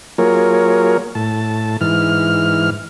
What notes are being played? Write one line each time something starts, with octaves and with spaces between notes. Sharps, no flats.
F#3 A#3 F4 G#4 A#4 C#5
A2 A5
G#2 E3 F6